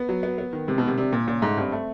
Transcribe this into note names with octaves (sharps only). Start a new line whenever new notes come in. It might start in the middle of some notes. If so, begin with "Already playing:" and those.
Already playing: B3
F#3
B3
B3
D#3
C3 G#3
B2
C3 D#3
C3 D4
A#2 D4
A#2 C#3
G#2 A3
G2 C4
A3